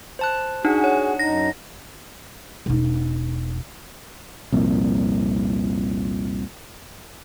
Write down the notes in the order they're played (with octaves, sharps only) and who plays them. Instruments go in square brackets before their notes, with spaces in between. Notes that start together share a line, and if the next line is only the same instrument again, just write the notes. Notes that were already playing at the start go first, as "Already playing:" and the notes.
[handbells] C5 A5 F#6
[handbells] D4 F#5 [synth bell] D#4 [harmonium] F#4 G#4
[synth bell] C#5
[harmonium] F#2 D#4 [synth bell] A#6
[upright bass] E1 D#4
[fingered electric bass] C2 F2 A#2